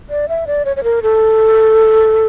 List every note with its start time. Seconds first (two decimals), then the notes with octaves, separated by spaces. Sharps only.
0.10 D5
0.29 E5
0.47 D5
0.65 C#5
0.76 C#5
0.84 A#4
1.03 A4